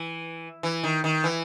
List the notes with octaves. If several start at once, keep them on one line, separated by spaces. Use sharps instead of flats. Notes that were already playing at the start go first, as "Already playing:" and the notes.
Already playing: E3
E3
D#3
D#3
E3